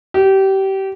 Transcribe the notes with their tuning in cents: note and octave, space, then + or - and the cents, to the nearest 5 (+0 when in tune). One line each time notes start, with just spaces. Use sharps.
G4 -25